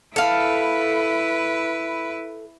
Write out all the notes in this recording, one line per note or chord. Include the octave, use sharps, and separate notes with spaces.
E4 A4 B4 F5